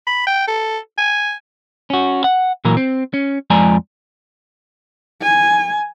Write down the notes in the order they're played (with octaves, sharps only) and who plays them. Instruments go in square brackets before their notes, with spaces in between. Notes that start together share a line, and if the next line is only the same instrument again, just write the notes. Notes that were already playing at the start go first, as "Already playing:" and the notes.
[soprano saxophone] B5
G5
A4
G#5
[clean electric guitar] C#4 F#4
F#5
A#2 E3 F#3 A#4
C4
C#4
F2 F3 G#3 D5 G#5 A#5
[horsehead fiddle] G#5